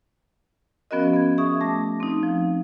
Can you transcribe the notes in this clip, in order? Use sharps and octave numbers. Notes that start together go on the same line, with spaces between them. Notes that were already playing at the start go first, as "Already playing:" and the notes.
F3 B3 C#4 F#4 A#4 D#5
B3 G#6
G#4 E5 C#6 D#6
A3 D6 A#6
C4 D#4
F3